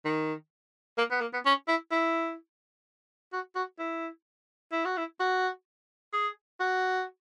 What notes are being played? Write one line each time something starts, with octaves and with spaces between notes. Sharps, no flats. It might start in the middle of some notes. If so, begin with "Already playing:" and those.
D#3
A#3
B3
A#3
B3
C#4
E4
E4
F#4
F#4
E4
E4
F#4
E4
F#4
G#4
F#4